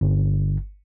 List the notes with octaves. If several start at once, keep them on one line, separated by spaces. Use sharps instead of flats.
G1